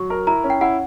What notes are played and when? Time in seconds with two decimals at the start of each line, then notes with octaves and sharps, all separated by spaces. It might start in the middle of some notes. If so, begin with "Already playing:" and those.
Already playing: F#3 C#6
0.10 A#4
0.27 E4 A#5
0.44 C#4
0.50 G5
0.61 E4 F#5